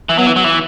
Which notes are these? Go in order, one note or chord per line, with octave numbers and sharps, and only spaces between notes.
E3
F#3 B3
E3
F#3
E3